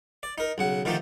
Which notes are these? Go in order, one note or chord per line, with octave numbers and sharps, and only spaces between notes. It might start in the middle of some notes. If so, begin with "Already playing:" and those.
D5
D#4 A#4
B1 C#3 F#5
D3 D#3 F3 A3 D#4 G4